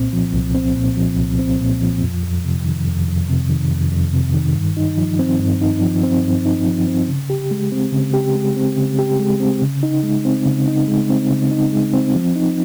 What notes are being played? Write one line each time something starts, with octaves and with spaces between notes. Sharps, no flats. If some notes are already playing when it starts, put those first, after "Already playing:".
Already playing: C2 A#2 C4
F3
C2
C4
A#2
F3
C2
C4
A#2
F3
F2
F2
C3
D#3
F2
F2
C3
D#3
F2
F2
C3
D#3
G2
D#4
F3
C4
G2
D#4
F3
C4
G2
D#4
F3
C4
C#3
G4
G#3
C4
C#3
G4
G#3
C4
C#3
G4
G#3
C4
C#3
D#4
G#3
C4
C#3
D#4
G#3
C4
C#3
D#4
G#3
C4
F3
D#4